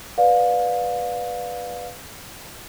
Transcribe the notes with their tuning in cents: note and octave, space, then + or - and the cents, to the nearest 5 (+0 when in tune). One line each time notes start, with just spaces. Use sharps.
B4 +0 D5 +0 F5 +25